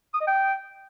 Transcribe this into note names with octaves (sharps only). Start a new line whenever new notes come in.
D#6
D#5
G5